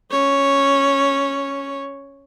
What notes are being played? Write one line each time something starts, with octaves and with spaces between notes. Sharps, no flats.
C#4 C#5